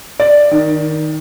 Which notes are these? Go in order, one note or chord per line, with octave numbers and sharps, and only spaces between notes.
D5
D#3